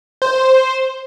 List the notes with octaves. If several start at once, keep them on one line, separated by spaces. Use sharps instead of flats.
C5